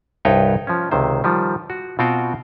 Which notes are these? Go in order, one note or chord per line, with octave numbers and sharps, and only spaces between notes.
C2 G2 D#4 B4 C#5 G5
F3 C#4
C#2 C3 D#3 C5
D#3 F3 G3
F#4
B2 C4 F4 F#4 F5 G5